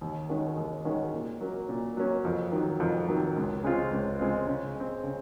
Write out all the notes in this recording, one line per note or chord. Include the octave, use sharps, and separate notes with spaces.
D#2
D#3 G#3 C#4 F#4
D#2
D#3 G#3 C#4 F#4
A#2
F#3 A#3 C#4
A#2
F#3 A#3 C#4
F2
D#3 F#3
F2
D#3 F#3
C#2
C#3 G#3 C4 F4
C#2
C#3 G#3 C4 F4
C#3
G#3 C4
C#3